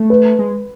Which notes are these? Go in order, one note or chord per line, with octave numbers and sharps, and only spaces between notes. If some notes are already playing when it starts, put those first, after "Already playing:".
Already playing: A3
B4
G#3